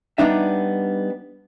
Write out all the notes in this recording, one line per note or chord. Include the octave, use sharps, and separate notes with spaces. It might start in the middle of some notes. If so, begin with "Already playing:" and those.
G3 B3 D4 D#4 E5